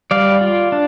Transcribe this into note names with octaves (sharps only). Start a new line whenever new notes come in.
G3 D5 F5
F4
D4